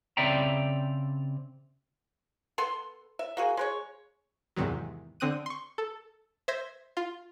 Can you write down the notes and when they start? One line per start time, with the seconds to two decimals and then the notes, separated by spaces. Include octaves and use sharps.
0.17 C#3 C4 D5 E5 G5 A#5
2.58 B3 A4 C6
3.19 E5
3.37 A#3 F#4 G#4
3.57 G#3 B4 C#5
4.56 E2 G#2 C3 D#3 F#3
5.20 D3 C4 D#6 F#6 D#7
5.46 C6 C#6
5.78 A4
6.48 C5 E5 G#6 A#6
6.97 F4